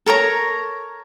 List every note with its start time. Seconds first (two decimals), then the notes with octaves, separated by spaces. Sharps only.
0.06 A4 A#4 C#5 A#5